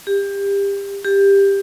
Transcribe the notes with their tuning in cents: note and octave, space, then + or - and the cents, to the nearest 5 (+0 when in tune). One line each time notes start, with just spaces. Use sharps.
G4 +25
G4 +15